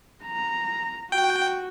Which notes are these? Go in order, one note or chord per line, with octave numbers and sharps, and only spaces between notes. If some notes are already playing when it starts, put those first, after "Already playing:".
A#5
F#4 G5